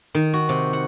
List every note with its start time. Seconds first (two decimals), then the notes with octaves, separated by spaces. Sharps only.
0.15 D#3
0.33 F#4
0.49 C3
0.73 F#5